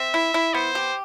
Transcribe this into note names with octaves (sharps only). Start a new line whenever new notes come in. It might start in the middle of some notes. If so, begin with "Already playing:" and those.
Already playing: C4 E5
E4
E4
B3 C5
G4